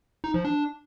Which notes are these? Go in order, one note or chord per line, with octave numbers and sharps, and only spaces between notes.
D#4
F3
D4